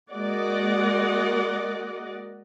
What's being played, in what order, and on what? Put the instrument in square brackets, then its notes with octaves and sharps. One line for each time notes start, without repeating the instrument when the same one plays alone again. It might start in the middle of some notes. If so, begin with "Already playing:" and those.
[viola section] G#3 A#3 F#4 D5 D#5 F#5